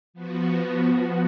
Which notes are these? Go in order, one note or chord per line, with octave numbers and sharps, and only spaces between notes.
F3 B3 F#4